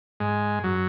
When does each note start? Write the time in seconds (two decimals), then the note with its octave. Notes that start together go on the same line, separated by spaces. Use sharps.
0.20 G#2 G#3
0.63 F#2 F#3